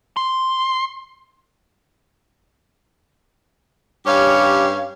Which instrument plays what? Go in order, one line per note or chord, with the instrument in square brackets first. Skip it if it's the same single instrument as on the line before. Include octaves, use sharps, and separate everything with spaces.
[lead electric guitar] C6
[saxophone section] G2 C#4 G4 C#5 F5